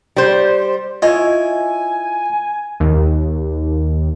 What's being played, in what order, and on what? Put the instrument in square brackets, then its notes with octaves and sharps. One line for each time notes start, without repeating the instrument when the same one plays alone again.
[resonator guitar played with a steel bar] G3 C5
[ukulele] E4 C#5 D#5 [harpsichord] F4 [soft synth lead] G#5
[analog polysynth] D#2